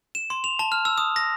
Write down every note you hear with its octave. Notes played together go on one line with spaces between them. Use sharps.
E7
C6
F7
A5
F6
E6
D#6
A#6